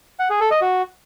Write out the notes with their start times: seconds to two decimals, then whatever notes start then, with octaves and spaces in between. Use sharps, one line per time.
0.19 F#5
0.30 G#4
0.40 A4
0.51 D#5
0.61 F#4